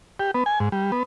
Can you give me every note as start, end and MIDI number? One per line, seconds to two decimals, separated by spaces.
0.19 0.31 67
0.35 0.44 59
0.46 0.59 80
0.60 0.69 44
0.72 0.91 55
0.92 1.03 59